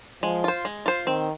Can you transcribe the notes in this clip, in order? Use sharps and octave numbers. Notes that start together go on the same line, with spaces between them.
F3 G#3
F4 C5
G#3
F4 C5
D#3 C4